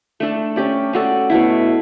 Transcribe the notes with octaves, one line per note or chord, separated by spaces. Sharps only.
A3 D4 A4
C#4 G4 D5
C#4 F#4 A4 D5
B2 A3 E4